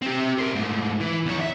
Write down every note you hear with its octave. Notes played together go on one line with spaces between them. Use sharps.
C4 G4
A#4 C5
G#2 A3
E3
E2 C#5
E5